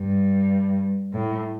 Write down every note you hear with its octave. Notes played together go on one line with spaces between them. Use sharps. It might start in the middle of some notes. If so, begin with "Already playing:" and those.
Already playing: G2
A2